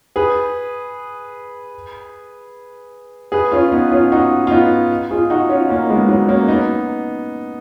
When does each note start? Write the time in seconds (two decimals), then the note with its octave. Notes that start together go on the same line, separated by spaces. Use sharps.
0.16 G#4 B4
3.32 G#4 B4
3.52 C#4 F4
3.72 B3 D#4
3.91 C#4 F4
4.12 D#4 F#4
4.47 F4
4.51 B3 D#4
5.11 F4 G#4
5.30 D#4 F#4
5.49 C#4 F4
5.69 A#3 C#4
5.89 G#3 B3
6.09 F#3 A#3
6.28 A#3 C#4
6.48 B3 D#4